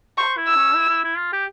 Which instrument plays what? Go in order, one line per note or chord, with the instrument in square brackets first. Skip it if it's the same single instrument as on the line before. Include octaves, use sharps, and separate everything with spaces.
[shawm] C5 [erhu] C#6
[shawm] E4
[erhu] E6
[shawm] C#4
E4
E4
E4
F4
G4